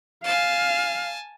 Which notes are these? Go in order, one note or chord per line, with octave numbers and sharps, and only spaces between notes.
F5 G#5 A5